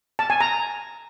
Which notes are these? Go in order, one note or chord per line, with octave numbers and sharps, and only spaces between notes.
A5
G#5
A#5